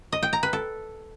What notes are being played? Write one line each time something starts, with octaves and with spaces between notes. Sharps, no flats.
D#5
G5
A#5
B4
A4